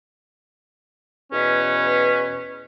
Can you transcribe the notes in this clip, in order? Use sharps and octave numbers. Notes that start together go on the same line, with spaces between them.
E2 B2 C#4 B4